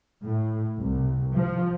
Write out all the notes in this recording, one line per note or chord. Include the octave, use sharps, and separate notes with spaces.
A2
C2
F3